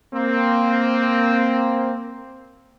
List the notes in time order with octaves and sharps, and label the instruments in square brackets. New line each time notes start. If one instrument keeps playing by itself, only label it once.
[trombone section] A#3 C4